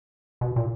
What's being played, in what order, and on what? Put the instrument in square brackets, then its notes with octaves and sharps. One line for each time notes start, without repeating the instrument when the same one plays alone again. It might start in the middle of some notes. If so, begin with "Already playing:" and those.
[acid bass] B2
A#2